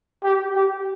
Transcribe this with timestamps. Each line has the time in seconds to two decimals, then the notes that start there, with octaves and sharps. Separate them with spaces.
0.23 G4
0.55 G4